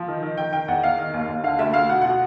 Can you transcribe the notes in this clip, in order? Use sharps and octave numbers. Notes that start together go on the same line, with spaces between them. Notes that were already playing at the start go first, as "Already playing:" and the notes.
Already playing: F3
D#3
D#3
D#3 G5
D#3 G5
E2 F#5
E2 F5
D#3
D#2
D#2
D3 F5
D2 E5
D2 F5
B2 F#5
B2 F#5